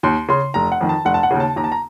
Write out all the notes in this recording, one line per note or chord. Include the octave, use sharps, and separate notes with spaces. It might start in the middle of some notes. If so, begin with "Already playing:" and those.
D#2 C6
C#3 C6
F1 A#5
F#5
F2 D#3
A5
F1 F#5
A5
F#5
D#2 C#3
A5
D#2 A#5
A5
A#5